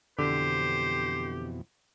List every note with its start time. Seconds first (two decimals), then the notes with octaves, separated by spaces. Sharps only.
0.19 F2 B2 D3 E3 G4 C5